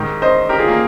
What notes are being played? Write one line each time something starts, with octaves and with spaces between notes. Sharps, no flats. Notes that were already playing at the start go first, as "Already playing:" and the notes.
Already playing: G#2 D#3 G4
C5 D#5
G4 A#4
F4 G#4
A#3